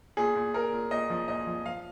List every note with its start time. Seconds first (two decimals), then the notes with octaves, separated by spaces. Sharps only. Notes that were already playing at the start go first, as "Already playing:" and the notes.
0.17 A#2 G#4
0.35 A#2
0.54 A#2 A#4
0.73 A#2
0.91 A#2 D#5
1.10 F3
1.28 A#2 D#5
1.47 F3
1.65 F3 F5